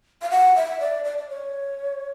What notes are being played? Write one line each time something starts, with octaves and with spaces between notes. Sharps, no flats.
F5
F#5
E5
D5
D5
D5
C#5